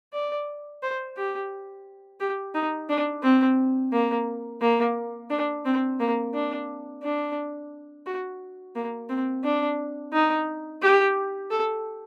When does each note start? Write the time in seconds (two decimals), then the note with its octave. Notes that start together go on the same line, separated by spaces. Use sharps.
0.13 D5
0.82 C5
1.17 G4
2.20 G4
2.54 D#4
2.89 D4
3.23 C4
3.92 A#3
4.61 A#3
5.30 D4
5.65 C4
5.99 A#3
6.34 D4
7.03 D4
8.06 F#4
8.76 A#3
9.09 C4
9.44 D4
10.13 D#4
10.82 G4
11.51 A4